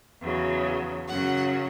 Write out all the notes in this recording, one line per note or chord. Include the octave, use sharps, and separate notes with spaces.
E2 C#3 F#3
F#2 C#3 F#3 F#5